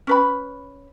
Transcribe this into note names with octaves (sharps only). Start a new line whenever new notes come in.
C#4 B4 B5